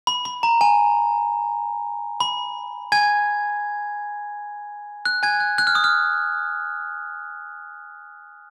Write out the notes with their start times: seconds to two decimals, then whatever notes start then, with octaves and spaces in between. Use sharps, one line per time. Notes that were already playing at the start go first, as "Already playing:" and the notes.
0.07 B5
0.25 B5
0.43 A#5
0.61 G#5
2.21 B5
2.92 G#5 G#6
5.05 F#6
5.23 G#5 G#6
5.40 F#6
5.58 F#6
5.67 F6
5.75 D#6
5.84 F6